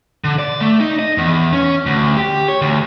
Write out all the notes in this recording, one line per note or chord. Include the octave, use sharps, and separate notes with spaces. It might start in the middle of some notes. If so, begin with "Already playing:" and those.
D3
D5
A3
D#4
D#5
E2
C#4
D2
G4
C#5
D2